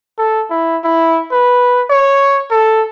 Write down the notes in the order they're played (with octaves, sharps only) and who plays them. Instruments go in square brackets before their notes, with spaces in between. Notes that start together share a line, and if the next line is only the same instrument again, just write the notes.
[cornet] A4
E4
E4
B4
C#5
A4